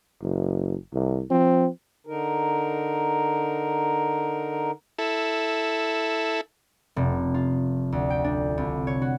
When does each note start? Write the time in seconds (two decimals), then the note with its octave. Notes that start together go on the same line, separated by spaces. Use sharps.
0.22 F#1
0.93 C2
1.30 F3 C4
2.07 D3 D#4 A#4
4.99 E4 A4
6.96 F1
7.34 F4
7.92 D2
8.10 G5
8.24 D4
8.58 C2
8.87 C#5
9.01 F#4